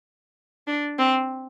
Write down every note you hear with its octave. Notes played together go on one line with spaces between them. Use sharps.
D4
C4